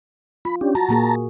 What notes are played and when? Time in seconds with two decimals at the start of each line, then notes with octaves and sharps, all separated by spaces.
0.45 F4 B5
0.61 C#4 D4 G4
0.75 F#4 A5 A#5
0.89 A#2 A#3 G#4